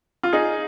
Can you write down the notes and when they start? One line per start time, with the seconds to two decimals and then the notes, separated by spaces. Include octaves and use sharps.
0.23 F4
0.33 D#4 G#4